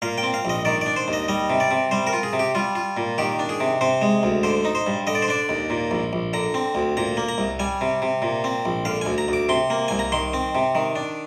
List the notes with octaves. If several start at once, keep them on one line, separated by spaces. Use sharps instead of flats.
A#2 F5
G5
C4
F5
A#1 D#5
D#3 D5
D4 D5
C5
D#2 D#5
G3 D#5
C3
D5
C3
G3 C5
A#4
F4
G#4
C3
G4
G3 F4
F4
A#2
D#3 G4
D4
G#4
C3
C3 C5
G#3
D2
D3 C5
D#4
C5
G2
D3 D#5
D5
C5
D4 D5
D#2
A#2
A#1
A#1
D3 A#5
C4
D2
A#2 A#5
A#3
A#5
C2
G3 G#5
C3
C3
A#2
C4
A#1
D3 F5
D2 G#5
A#5
D2 D6
C3 C6
A#3
C2 G#5
A#5
D#3 C6
C4
C3
D#3
D4